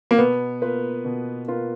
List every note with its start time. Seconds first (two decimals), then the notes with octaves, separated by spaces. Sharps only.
0.11 A#3
0.18 B2 B3
0.62 A#3 F4 B4
1.05 B2
1.48 A#3 F4 B4